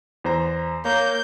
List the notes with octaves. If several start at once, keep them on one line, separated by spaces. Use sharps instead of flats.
E2 C5 A#5
A#3 C#5 A#5 G6